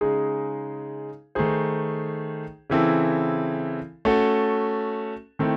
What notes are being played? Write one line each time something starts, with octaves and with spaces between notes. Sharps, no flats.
C#3 G#3 D#4 G#4
D#3 A3 D#4 G#4 C5
C#3 E3 C4 E4 A4
A3 C#4 F#4 A4
D#3 A3 C4 E4